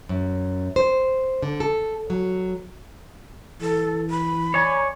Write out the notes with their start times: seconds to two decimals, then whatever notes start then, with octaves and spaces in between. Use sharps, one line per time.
0.09 F#2
0.76 C5
1.43 D3
1.60 A4
2.10 F#3
3.61 E3 A4
4.10 B5
4.54 C#5 D5 G#5